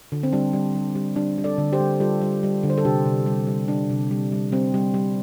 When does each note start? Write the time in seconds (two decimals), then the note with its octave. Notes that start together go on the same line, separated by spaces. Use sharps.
0.12 D3
0.23 C4
0.33 G3 D4
0.53 G3
0.75 G3
0.95 G3
1.16 G3 D4
1.38 G3
1.44 A4 D5
1.58 D3
1.73 G4 C5
1.80 G3
2.00 G3 F4 A4
2.21 G3
2.43 G3
2.63 D3
2.70 C5
2.78 A4
2.85 C3 D4 G4
3.05 C3
3.26 G3
3.47 G3
3.68 G3 D4
3.89 C3
4.11 G3
4.32 G3
4.52 G3 C4
4.74 G3
4.94 G3